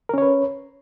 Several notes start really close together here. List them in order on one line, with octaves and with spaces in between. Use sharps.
A#4 C#4 C#5 B4